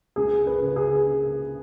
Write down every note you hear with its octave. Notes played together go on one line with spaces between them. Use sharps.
C#2 G#4
B4
C#3
G#4